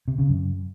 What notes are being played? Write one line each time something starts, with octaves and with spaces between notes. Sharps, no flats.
C3
C#3
F#2